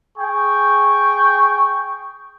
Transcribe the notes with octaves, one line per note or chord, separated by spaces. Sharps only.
G#4 G5 C#6